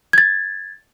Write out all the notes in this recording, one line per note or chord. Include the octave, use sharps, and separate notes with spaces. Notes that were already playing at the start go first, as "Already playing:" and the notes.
G#6 A6